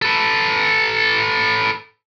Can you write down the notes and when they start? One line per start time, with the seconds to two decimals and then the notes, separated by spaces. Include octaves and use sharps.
0.02 A4 B4